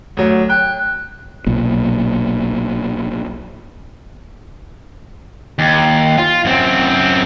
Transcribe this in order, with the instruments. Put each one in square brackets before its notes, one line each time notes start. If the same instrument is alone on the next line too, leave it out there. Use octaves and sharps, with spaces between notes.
[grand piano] D2 F#3
[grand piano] G5 [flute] F#6
[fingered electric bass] B1 A#2
[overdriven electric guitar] D#2
F4
F#2 C4